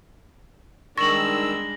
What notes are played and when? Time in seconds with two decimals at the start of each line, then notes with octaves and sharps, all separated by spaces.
0.98 D#3 G3 G#3 D4 C#6 E6 A#6 F#7